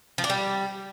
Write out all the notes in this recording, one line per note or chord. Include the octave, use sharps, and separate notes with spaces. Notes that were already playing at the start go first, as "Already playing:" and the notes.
F3
D4
G3